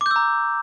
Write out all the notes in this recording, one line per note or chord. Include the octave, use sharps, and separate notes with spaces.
A#5 D6 E6 G6